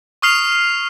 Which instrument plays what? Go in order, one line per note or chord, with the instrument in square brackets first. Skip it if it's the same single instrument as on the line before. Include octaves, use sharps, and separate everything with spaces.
[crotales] C#6 D#6 F6 C7 F7